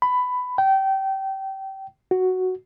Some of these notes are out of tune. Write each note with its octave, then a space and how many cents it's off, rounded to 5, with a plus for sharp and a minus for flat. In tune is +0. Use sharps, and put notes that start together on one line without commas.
B5 +15
G5 -25
F#4 +0